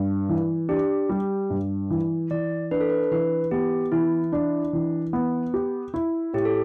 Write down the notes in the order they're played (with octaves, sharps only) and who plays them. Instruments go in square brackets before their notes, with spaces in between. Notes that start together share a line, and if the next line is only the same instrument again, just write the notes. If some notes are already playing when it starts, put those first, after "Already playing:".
Already playing: [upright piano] G2
E3
[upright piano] D4 [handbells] G4
[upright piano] G3
G2
E3
[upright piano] E3 [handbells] D5
[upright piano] D4 [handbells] B4
[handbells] A4
B4
[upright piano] E3 [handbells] B4
[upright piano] B3 [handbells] G4
[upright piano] E3 [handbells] E4
[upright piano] D4
E3
B3
G4
E4
[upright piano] A2 [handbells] G4
[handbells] A4